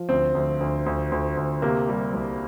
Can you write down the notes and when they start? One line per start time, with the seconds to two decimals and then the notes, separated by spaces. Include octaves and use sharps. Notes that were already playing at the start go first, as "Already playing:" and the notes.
Already playing: F3
0.09 D2 C4
0.35 D2
0.60 D2
0.86 D2
1.12 D2
1.37 D2
1.62 C3 A#3
1.88 G3
2.14 C2